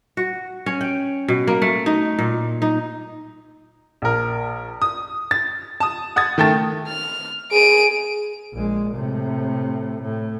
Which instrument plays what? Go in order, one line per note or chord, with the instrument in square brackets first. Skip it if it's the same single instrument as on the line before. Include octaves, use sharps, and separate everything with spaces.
[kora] F#4
C#4
G5
B2
A#3
A3
D#4
A#2
D#4
[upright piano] A#1 A#4
D#6
A6
A5 D#6
F#5 D#6 G#6 A6
D#3 A3 G5 A5 A6
[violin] F6
[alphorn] G#4 [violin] D7 D#7
[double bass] A#1 G#3
A2 C3
A2